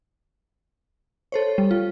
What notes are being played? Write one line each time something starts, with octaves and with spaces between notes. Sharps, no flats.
A4 C5 C#5
G3
F4